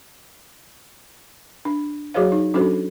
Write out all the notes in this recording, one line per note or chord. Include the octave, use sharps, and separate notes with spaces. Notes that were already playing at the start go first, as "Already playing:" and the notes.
D4
F#3 F#4 G#4 C5 C#5 F5
D#4
F#3 C#4 D4 F#4 A4 C5